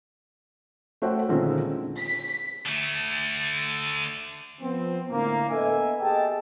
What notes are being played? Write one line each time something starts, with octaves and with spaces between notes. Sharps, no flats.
A3 F#4 C5 C#5 F#5 G5
A#2 D3 D#3 G#3 C4 C#4
B6
D3 A3
F3 B3 C4
A2 D3 A#3
A#3 B3 A4 D#5 E5 G#5
G4 G#4 D#5 G5 A5